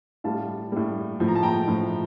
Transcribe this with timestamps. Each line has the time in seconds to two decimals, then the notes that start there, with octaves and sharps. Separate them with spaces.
0.24 A2 G3 F5 A5
0.72 A2 G3
1.20 A2 F3
1.28 A#5
1.35 A5
1.43 G5 A#5
1.67 A2 F3